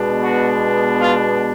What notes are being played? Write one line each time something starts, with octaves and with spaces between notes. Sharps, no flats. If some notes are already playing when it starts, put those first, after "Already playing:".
Already playing: B2 G#3 B3 D4
F#4
F4